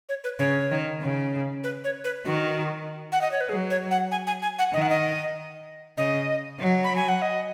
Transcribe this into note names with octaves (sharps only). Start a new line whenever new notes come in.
C#5
B4
C#3 C#5
D#3
C#3
B4
C#5
B4
D#3 F#4
F#5
D#5
C#5
B4
F#3 G#4
C#5
F#5
G#5
G#5
G#5
F#5
D#3 D#5
F#5
D#5
C#3 D#5
F#3
B5
G#5
F#5
D#5